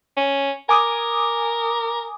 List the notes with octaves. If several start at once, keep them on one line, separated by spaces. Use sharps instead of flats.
C#4
A#4 G#5 D6 D#6